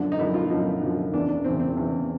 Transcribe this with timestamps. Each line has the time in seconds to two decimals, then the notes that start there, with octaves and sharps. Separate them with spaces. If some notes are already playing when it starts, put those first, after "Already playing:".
Already playing: F#2 D3 F3 D4
0.12 D#4
0.19 F#2 D3 F3 E4
0.34 F4
0.50 F#2 D3 F3 D#4
0.82 F#2 D3 F3
1.13 E2 C#3 E3 D4
1.29 D4
1.44 E2 C#3 E3 C4
1.60 C4
1.76 E2 C#3 E3